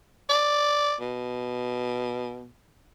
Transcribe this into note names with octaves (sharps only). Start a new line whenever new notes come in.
D5
B2